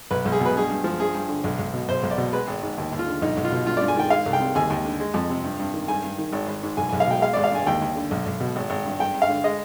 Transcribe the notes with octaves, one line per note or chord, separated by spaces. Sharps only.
B1 B4
B1
G#4
B2 B4
G2 G#4
G2
F3
G2 G#4
G2
D3
B1
B1
B2
B1 C5
B1
D5
B2
G#3 B4
G#1
G#2
D#2
D#2
F4
D3
B1 D#4
B1
F4
B2
G2 F4
G2 D5
G#5
D#3 G5
G#3 F5
C2
G5
C3
D#2 G#5
D#2
D3
G#3
F2
C3
G2
G2
D#3
G2 G#5
G2
D#3
G#1
G#1
G#2
B1 G#5
B1 G#5
F5
B2 G5
G#3 F5
G#1 D5
F5
G2 G#5
D#2 G5
D#2
D3
B1
B1
B2
G#1
G#1
G2
G2 G5
G2
F5
D3
G#3 D#5